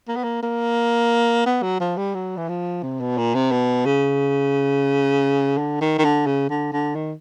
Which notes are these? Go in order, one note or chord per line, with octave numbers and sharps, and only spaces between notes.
A#3
B3
A#3
A#3
B3
F#3
F3
G3
F#3
E3
F3
C3
B2
A#2
C3
B2
C#3
D3
D#3
D#3
D3
C#3
D3
D3
D#3